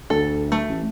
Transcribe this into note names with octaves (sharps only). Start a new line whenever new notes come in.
D2 A4
A3
A1